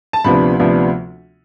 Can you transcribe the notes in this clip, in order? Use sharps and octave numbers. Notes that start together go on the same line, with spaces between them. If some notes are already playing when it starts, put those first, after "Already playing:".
A5
D2 C3 F3 B3 D4 B5
D2 C3 F3 B3 D4